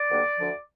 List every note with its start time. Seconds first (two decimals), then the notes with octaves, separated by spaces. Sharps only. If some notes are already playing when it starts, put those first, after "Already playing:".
Already playing: D5
0.09 D2 D3 G3 A#3 D4
0.38 D2 D3 F3